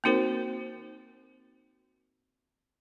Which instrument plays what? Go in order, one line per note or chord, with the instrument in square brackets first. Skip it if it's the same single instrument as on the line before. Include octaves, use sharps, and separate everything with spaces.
[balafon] A#3 C4 D#4 F#4 A#4 C5